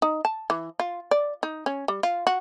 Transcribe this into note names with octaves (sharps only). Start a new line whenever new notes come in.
D#4
A5
E3
F4
D5
D#4
C#4
G3
F4
F#4